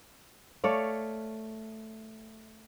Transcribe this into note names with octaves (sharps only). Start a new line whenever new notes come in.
A3 C#5 D5 F5